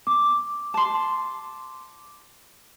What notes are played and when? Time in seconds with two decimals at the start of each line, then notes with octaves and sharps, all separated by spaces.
0.07 D6
0.74 A5 C6